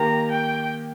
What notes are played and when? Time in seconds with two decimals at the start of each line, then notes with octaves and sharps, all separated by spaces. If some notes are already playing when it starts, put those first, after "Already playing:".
Already playing: D#3 A#3 G4 A#5
0.31 G5